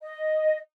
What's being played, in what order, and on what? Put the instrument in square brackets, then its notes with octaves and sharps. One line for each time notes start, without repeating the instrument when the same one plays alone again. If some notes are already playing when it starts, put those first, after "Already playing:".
[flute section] D#5